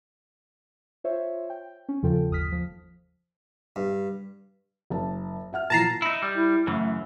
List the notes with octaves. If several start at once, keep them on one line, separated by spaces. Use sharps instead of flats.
F4 C5 C#5 E5
G5
C#4
E2 C#3 F3 F4 A4 G5
G1 D#2 D#6 F6 B6
F3
G2
F#1 A5
E5 F#5 F6
A#2 E3 F3 A5 A#5 C7
D#4 E4
G3
E4
F#2 C#3 E3 A3